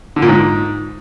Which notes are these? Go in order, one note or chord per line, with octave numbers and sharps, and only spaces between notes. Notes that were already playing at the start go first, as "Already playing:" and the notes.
D3
A#2
G#2